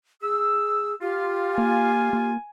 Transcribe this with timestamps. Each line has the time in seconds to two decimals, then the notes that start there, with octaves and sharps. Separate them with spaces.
0.22 G#4 E6
1.01 F4 G4
1.58 A#3 G#5
2.13 A#3